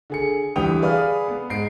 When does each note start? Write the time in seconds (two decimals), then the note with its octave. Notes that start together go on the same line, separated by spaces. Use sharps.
0.10 D3 G#4 C#7
0.56 D2 E3 G3 G5 D#6 F7
0.82 G#4 B4 D5 F5 D#6 F6
1.28 B3
1.50 G#2 C7 D7